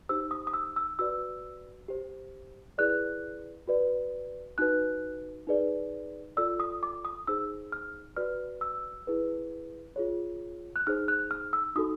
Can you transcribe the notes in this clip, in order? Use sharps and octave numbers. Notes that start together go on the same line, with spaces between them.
D#4 G4 C5 E6
D#6
D#6
E6
E6
F#4 B4 D5 E6
G4 C5
E4 G#4 B4 D5 F#6
F#4 B4 D5
D#4 F#4 B4 F#6
D#4 G#4 B4 D5
F4 A4 D5 E6
D#6
D6
D#6
D#4 G#4 C5 E6
F6
F#4 B4 D5 F6
E6
E4 G#4 B4
F4 G#4 C#5
F#6
D#4 G#4 C5 F6
F#6
F6
E6
D#4 F#4 A4 D#6